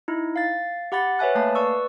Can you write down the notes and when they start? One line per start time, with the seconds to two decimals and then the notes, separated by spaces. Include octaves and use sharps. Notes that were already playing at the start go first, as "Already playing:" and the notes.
0.08 D#4 E4
0.36 F5 A6
0.92 G4 F#5 B5 A6
1.19 B4 C#5 E5 G#5 F#6
1.35 A3 A#3 F5 A5
1.55 B4 D5 C#6 E6